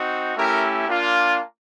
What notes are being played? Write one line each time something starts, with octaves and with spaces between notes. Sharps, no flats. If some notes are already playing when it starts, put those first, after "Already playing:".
Already playing: C4 D#4 F#4
A3 C#4 E4 G4 A#4
A#3 D4 F4